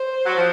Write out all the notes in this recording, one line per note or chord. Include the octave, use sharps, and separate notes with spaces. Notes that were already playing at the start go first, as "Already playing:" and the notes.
Already playing: C5
F#3
F3